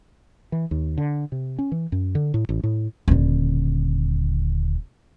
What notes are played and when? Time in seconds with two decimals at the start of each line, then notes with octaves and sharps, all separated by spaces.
0.52 E3
0.71 D#2
0.98 D3
1.32 C3
1.59 C#4
1.72 E3
1.92 F#2
2.15 D3
2.34 A2
2.49 A1
2.64 A2
3.08 D#1 D3